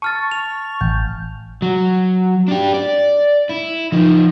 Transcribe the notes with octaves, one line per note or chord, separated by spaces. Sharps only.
A5 C#6 F6 A6
F7
A1 G6
F#3
D4 G4
D5
E4
F3 D#4